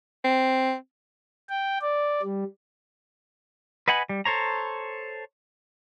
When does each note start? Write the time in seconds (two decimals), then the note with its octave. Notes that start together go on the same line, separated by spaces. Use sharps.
0.24 C4
1.49 G5
1.82 D5
2.23 G3
3.88 B4 D#5 F#5 G#5 B5
4.09 G3
4.25 A4 C5 C#5 A#5